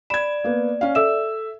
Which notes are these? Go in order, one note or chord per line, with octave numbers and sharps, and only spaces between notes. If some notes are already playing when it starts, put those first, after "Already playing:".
D5 B5 G#6 E7
A#3 B3
C#4 F5
A4 E5 E6 E7